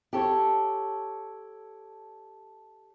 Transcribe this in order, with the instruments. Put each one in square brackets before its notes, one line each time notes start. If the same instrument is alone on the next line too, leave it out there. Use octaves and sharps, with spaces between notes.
[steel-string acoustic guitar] G4 A4 C#5